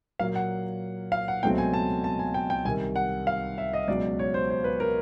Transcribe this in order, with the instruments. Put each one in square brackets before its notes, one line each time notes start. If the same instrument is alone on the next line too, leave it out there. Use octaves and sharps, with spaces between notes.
[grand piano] A#2 F#3 A#3 F5
F#5
F5
F#5
C#2 B2 F#3 A3 C4 G5
G#5
A5
A5
G#5
G5
G5
C2 C3 D#3 G#5
F#5
F5
E5
D#5
C#2 B2 F#3 D5
C#5
C5
C5
B4
A#4